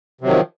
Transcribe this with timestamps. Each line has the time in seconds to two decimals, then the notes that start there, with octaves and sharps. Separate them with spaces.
0.21 C3
0.24 F#3
0.27 D#3
0.30 F3